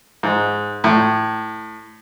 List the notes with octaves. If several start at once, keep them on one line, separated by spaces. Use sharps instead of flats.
G#2
A2